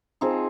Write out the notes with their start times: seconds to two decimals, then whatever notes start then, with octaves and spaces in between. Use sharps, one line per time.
0.21 F3 C4 D#4 G#4